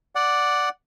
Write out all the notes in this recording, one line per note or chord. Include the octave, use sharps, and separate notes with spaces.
D5 F#5